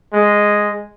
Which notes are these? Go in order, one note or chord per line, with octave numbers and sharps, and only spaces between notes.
G#3